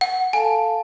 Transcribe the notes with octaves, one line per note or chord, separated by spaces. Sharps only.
F#5
A4 F5 G#5 A5